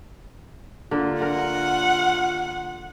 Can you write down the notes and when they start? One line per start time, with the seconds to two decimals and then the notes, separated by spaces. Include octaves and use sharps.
0.91 D3 A#3 F4
1.22 A#4 F#5